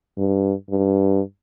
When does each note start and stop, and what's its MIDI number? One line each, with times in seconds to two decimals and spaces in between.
0.17 0.53 43
0.70 1.21 43